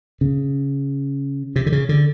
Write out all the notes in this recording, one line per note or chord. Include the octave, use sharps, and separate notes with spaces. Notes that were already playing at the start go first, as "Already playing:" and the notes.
C#3
C3
D3
C#3
D3